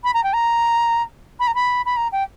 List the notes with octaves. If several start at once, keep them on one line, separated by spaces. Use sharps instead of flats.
B5
A#5
G5
A#5
B5
A#5
B5
B5
A#5
G5